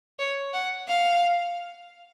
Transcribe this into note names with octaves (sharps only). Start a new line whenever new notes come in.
C#5
F#5
F5